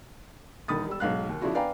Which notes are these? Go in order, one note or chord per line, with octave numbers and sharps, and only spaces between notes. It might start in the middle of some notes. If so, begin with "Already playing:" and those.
E1 D#3 B5 D#6 A6
G3 E6
B1 G#2 F5 F#6
D#2
C#3 F3 D4 E4 F#4
B4 D5 F5 G5 G#5 A#5